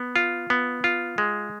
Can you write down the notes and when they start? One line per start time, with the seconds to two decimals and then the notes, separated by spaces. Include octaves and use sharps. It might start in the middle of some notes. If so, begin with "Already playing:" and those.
Already playing: B3
0.16 F4
0.50 B3
0.84 F4
1.18 G#3